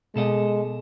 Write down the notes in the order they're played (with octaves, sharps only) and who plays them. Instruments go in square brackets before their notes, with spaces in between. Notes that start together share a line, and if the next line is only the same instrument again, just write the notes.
[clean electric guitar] B2 A4 D#5 [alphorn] G#3